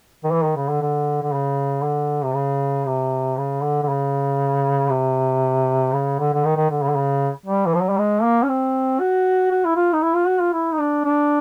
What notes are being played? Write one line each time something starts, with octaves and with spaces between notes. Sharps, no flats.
D#3
E3
D#3
C#3
D3
D3
D3
C#3
D3
C3
C#3
C3
C#3
D3
D3
C#3
C3
C#3
D3
D3
D#3
D#3
D3
C#3
D3
C#3
G3
E3
F3
F#3
G3
G#3
A#3
C#4
C4
F#4
F#4
E4
F4
D#4
E4
F4
F#4
F4
E4
D#4
D4
D4